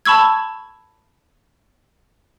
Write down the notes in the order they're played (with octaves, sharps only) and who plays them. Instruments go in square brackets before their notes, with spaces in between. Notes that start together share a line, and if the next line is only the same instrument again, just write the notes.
[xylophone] A5 B5 C#6 E6 G#6